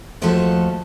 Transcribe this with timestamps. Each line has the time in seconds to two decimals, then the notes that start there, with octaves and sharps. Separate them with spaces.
0.21 D#2 F3 A3 F4 F#4 A4